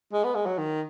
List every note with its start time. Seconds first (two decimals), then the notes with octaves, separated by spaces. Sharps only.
0.12 G#3
0.24 B3
0.35 G#3
0.46 F#3
0.58 D#3